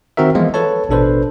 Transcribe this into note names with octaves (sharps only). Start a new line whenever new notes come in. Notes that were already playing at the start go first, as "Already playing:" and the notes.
D#3 C4 F#4 A#4 E5
E3 F3 G#3 B3 F4
A4 B4 C#5 A5
A1 B2 D4 A4 B4 C5